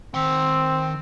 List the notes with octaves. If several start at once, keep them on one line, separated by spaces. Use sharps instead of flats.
D#3 C4 C6